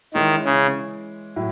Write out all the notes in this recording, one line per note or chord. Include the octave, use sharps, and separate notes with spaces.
D#3 E3 G#3 C#4 E4
C#3
A2 F#3 E4